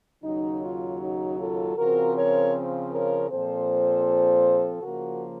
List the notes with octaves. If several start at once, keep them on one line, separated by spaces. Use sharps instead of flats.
D#2 C#3 F#3 D#4
F4
D#4 F#4
F4 A4
C#3 F3 C4 F#4 A#4
A#4 C#5
A#4 C#5
A#2 F3 C4 A4 C5
C#3 F3 A#3 F#4 A#4